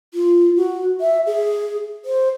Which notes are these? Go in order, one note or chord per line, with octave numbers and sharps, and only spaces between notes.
F4
F#4
E5
G#4
C5